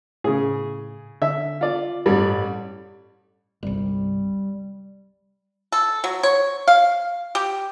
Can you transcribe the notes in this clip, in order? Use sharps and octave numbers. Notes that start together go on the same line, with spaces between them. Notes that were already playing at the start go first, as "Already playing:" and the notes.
A2 C#3 G#4
D3 E5
F4 D5
A1 G2 G3
G1 C2 G3
A4
F#3
C#5
F5
G4